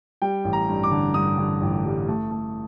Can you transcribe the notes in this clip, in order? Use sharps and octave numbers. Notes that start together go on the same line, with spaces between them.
G3 G5
A1
A#5
G2
D6
D3
G2 D#6
D3
A1
G3
A3
A3